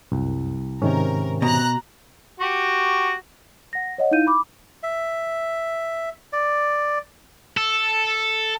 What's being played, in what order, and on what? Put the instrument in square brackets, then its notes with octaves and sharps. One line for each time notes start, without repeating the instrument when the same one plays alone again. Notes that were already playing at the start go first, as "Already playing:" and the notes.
[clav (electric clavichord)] C2 [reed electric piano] F#2
[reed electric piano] G#2 D#3 [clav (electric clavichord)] C3 C#4 [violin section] A#4
[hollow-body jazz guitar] B2 [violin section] A#5 F#6
[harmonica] F#4 G4 C#6
[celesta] F#5 A#6
C#5 D#5 F#5
D#4 E4 F5 G6 D#7
B5 D6
[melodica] E5
D5
[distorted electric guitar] A4